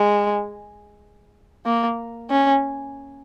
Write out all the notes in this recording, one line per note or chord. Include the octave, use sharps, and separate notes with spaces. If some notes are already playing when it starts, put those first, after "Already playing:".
Already playing: G#3
A#3
C#4